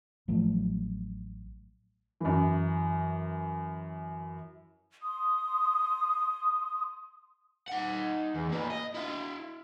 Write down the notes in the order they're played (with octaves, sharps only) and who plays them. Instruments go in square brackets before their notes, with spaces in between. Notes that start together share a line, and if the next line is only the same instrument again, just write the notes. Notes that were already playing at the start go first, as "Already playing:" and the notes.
[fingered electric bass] A1 F3 F#3 A3
[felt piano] F#2 E3
[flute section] C6 D#6
[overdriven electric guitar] D#4 F#5
E2
A#2 B4
D#5
E4 F5